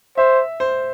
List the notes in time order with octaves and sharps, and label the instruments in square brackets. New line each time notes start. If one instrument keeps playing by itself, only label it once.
[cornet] C5 [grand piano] E5
[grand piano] C5